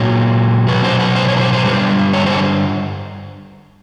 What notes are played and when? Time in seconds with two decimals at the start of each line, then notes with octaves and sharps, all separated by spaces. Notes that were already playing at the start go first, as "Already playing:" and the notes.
Already playing: A#2 F#3 C#5
0.68 B2 F#3 B4
0.84 C5
1.00 B4
1.16 C5
1.28 C#5
1.37 B4
1.41 C5
1.53 C5
1.65 G2 D3 G3 B4
2.13 C#5
2.26 C5